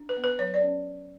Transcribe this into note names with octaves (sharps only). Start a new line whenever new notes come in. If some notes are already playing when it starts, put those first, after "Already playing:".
Already playing: D4
B4
B3
B4
F#3 C#5
D5
C#4